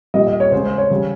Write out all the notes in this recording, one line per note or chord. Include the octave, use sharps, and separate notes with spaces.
A#2 G3 D#5
D#5
C#5
C#3 G#3 C5
C5
C#5
C#3 G3